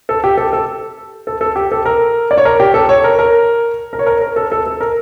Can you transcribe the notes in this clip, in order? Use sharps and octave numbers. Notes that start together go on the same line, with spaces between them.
A4
G4
A4
A4
A4
A4
G4
A4
A#4
D5
C#5
A#4
G4
A4
C#5
A#4
A#4
A#4
C#5
A#4
A#4
A4
A4
A4
A#4